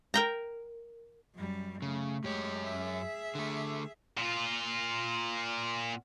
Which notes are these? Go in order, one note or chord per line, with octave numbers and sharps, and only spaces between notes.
A#4 G5 A#5
F#2 G3
C#3 A3
F#2 G#3 G4 C#5
G#4 E5
D3 A3
A#2 F4